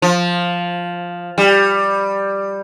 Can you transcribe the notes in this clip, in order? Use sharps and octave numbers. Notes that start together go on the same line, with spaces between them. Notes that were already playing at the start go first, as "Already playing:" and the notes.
F3
G3